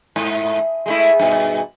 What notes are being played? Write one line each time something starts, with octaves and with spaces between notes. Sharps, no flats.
G#2
G#3 A3 E4
G2 B2